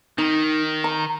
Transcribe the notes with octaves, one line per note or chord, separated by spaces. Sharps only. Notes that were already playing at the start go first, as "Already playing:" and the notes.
D#3 D#4
A#5